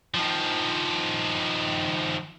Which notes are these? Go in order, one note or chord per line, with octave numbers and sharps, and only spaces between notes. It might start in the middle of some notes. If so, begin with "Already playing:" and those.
D#3 F3